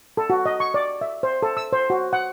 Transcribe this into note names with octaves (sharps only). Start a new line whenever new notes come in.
A4
F#4
D#5
C#6
D5
E5
C5
A4
E6
C5
F#4
F#5